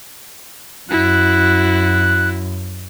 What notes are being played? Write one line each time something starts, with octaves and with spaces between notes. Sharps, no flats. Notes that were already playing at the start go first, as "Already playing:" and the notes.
F#2 E4 F#4 F#6